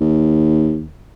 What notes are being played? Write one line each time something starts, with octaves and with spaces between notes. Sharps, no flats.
D#2